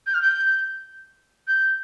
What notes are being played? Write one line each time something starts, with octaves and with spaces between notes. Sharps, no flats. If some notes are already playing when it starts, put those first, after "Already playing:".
G6
F6
G6
G6